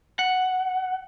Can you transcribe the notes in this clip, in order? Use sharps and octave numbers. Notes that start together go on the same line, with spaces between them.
F#5